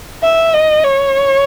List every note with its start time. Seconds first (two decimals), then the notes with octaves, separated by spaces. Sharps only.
0.23 E5
0.54 D#5
0.84 C#5